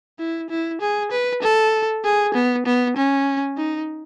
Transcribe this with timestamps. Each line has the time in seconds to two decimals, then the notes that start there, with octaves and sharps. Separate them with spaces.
0.19 E4
0.50 E4
0.81 G#4
1.12 B4
1.42 A4
2.04 G#4
2.34 B3
2.66 B3
2.97 C#4
3.57 D#4